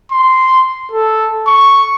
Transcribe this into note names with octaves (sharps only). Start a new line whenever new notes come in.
C6
A4
C#6